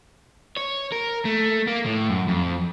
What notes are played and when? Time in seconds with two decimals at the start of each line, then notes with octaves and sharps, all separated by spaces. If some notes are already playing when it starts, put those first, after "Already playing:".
0.57 C#5
0.92 A#4
1.25 A3
1.68 A#3
1.86 A2
2.10 F#2
2.28 F2